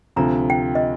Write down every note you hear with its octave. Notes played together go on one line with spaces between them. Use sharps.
D2 C3 F3 A#5
G5
D#5